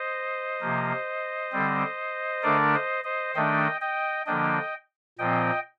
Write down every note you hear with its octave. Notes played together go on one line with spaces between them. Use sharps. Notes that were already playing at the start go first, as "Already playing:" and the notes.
Already playing: C5 D#5
C3 F3 A#3
D3 G3 C4
D3 A3 D4 A#4 D5
C5 D#5
C5 D#5
D#3 A3 D4 D#5 G5
D#5 G5
D3 F3 A#3 D4 D#5 G5
A#2 F3 C4 D#5 G5